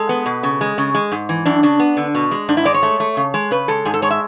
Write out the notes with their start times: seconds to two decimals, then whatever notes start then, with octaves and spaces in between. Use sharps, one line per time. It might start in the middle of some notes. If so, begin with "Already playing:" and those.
Already playing: G#3 A4
0.09 B3
0.26 B2
0.43 C#3
0.61 G#3
0.78 C#3
0.95 G#3
1.12 G#2
1.29 E3
1.46 F#2 D4
1.63 C#3 D4
1.80 B3
1.97 D3
2.15 B2
2.31 G#3
2.49 G#2 D4
2.57 E4
2.65 G#3 D5
2.74 C#5
2.83 A3
3.00 A3
3.17 C#3
3.34 G#3
3.51 C#3 B4
3.68 G#3 A4
3.85 G#2 G#4
3.94 A4
4.02 G#3 C#5
4.11 E5